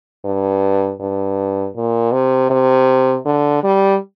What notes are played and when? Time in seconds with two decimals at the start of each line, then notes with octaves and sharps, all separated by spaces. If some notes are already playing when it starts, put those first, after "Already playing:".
0.25 G2
1.00 G2
1.76 A#2
2.12 C3
2.50 C3
3.25 D3
3.63 G3